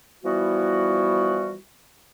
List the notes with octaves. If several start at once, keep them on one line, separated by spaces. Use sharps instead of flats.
E3 F3 G3 B3 E4 F#4